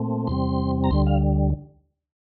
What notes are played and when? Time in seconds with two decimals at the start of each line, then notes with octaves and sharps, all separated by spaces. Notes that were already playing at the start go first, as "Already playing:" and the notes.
Already playing: A#2 A3 C4
0.27 E2 C3 G3 C4 C6
0.84 A#5
0.91 D2 D3 G3 C6
1.07 F5